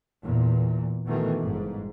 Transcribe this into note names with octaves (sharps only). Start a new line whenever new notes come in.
E2 A#2
B2 D#3 E3 A3
G1 G#2